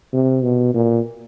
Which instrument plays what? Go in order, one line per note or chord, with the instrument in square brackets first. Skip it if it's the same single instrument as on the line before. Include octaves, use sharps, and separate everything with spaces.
[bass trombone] C3
B2
A#2